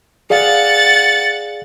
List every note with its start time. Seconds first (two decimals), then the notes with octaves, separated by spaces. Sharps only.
0.30 G#4 D5 F5 F#5 A6